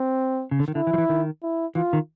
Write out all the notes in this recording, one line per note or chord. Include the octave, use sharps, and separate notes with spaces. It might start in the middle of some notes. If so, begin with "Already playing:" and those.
Already playing: C4
C#3
D3
D#3
D3 E4
E3
F3
E3
D#3
E4
E3 F4
D#3